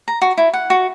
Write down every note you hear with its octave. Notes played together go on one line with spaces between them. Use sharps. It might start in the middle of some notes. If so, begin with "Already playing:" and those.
A#5
F#4
E4
F#5
F#4